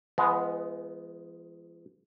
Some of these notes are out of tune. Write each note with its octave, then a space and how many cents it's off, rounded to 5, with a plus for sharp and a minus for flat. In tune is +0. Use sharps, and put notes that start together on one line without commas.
F3 -45 G#3 +0 B3 +0